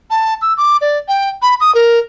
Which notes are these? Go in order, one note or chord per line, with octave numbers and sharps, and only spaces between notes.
A5
E6
D6
D5
G5
B5
D#6
A#4